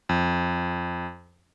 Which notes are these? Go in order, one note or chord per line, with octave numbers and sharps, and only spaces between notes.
F2